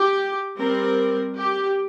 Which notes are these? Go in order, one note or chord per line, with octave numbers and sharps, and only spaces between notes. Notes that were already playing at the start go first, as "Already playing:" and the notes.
Already playing: G4
G3 C4 A#4
G4